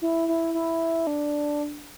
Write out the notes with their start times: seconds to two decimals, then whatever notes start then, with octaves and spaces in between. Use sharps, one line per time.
0.02 E4
0.28 E4
0.54 E4
1.07 D4